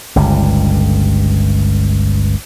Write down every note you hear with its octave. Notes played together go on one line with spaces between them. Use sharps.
G1 C#2 G2